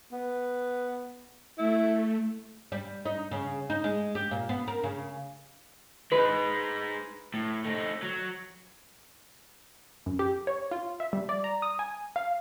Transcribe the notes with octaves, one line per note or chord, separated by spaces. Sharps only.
B3
A3 E4
G3
D#4
C#3
D#4
G#3
G4
A#2
B3
A#4
C#3
G#3 D#4 B4
A2
A3 D#4
F#3
F#2
G4
C#5
F4
E5
G3
D5
A#5
D#6
G#5
F5